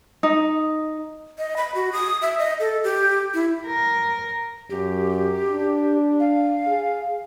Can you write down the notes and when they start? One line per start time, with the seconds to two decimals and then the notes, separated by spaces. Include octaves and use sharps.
0.23 D#4
1.39 D#5
1.57 B5
1.75 F#4
1.93 D#6
2.22 E5
2.39 D#5
2.60 A4
2.84 G4
3.34 E4
3.67 A#4
4.70 F#2 G4
5.50 D4
6.20 F5
6.67 G#4